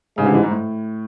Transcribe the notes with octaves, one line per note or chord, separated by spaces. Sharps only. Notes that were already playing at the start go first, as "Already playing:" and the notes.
A1 G#2 C#3 G#3
D3
E3
G#2
A2